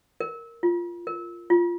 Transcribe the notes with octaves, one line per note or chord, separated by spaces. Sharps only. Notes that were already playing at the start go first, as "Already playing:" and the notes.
A#4
F4
A#4
F4